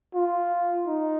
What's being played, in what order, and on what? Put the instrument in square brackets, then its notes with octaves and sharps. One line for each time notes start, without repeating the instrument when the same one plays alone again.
[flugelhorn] F4
D#4